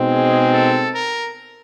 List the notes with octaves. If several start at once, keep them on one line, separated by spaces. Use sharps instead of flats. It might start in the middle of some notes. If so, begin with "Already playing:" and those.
Already playing: B2 G#3 C4 D#4
G#4
A4
A#4